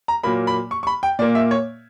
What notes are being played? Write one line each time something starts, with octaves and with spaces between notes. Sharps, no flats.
A#5
A#2 F#3 A#3 B5
B5
C#6
C#6
B5
G5
A#2 A#3 D5
E5
C#5